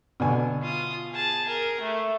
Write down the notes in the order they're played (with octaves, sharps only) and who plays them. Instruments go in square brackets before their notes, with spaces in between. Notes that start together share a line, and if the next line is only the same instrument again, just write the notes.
[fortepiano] B2 D3 G#5
[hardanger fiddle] F4 D#6
G#4 A5
G#4 A#4
A3